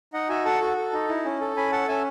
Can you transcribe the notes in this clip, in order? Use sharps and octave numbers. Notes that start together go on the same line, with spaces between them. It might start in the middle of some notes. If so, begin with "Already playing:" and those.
D#4 D#5 F#5
F#4 E5 G#5
A4 F#5 A5
F#4
A4
D#4
E4
C#4
A4
C#4 G#5 B5
A4 F#5 A5
C#4 E5 G#5